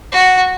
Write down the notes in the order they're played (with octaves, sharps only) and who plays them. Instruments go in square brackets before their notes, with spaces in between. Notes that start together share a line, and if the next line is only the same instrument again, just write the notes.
[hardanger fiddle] F#4